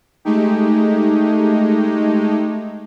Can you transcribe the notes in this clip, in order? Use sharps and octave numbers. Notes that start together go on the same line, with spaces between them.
G#3 A3 D#4 G4